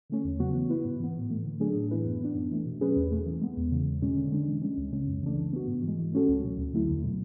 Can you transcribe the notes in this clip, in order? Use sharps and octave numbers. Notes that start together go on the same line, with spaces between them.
D3 A3 C#4
E2
C#3 F#3 B3 F#4
E3
B3 E4 B4
G#2
E3 B3
A2
E3 A3
D3
F#3 A3 D4 G#4
A2
E3 B3 E4 B4
F#2
E3 B3 D4
F#2
E3 A3
B2
F#3 C#4 G#4 B4
E2
B2 A3
E3
G#3 B3
E2
C#3 E3
E2
B2 G#3 C#4
D3
G#3 D4
E3
G#3 C#4
C#2
C#3 G#3 C#4
F#2
C#3 E3 A3 D4
E3
B3 F#4
G#2
E3
G#3
E3
A3 C#4 F#4 A4
C#2
B2 F#3
D2
D3 F#3 A3 E4
E2
B2 F#3